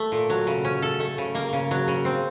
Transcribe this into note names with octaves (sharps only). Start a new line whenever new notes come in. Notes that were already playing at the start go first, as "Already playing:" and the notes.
Already playing: A3
A#2
F#3
C#3
C#4
A4
A3
C#3
A#3
C#3
F#3
C#3
C4